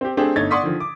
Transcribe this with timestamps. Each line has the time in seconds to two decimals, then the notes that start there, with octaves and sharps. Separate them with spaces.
0.01 C4 G4
0.17 A3 C4 D4 G4 G#4
0.36 G1 A3 D#4 C#5 G#6 A6
0.51 D5 F#5 C6 C#6 D#6 B6
0.63 D3 D#3 F3
0.80 D6